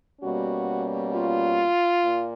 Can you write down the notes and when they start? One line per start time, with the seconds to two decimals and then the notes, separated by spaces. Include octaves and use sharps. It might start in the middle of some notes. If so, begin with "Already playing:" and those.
0.21 B2 G3 A#3 C#4 F#4
1.13 F4
2.04 A#2